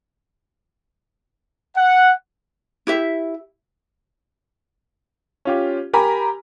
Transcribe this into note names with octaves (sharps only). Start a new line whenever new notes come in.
F#5
E4 G4 E5
C#4 F4 G4
G4 A#4 G#5 A#5 B5